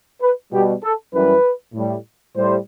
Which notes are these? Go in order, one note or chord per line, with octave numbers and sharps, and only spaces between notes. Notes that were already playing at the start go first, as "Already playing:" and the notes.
B4
B2 G3 G4
A4
F#2 E3 G3 B4
A2 G3
A2 G3 C5